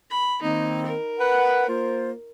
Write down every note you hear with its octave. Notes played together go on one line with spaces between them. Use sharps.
B5
D#3 A#3 C4 D#4
A#4
B4 F#5
A#3 F4 C5